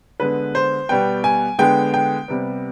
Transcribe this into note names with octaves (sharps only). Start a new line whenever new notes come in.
D3 G#3 B3 B4
C5
B2 G3 B3 G5
G#5
D3 G#3 B3 G5
G5
C3 G3 B3